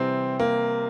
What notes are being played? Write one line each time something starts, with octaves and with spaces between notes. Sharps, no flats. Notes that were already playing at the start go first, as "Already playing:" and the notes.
Already playing: C3 E3 G3 C4
A#3